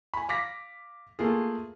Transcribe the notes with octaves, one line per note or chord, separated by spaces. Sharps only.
G#5 B5
F5 D6 A#6 B6
A3 A#3 F4 G#4